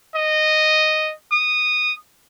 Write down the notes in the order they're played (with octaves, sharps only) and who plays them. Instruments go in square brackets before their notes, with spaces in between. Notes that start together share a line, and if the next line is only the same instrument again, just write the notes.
[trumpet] D#5
D#6